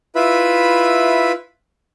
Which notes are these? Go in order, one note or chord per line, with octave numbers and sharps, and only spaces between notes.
E4 F4 B4 E5 B5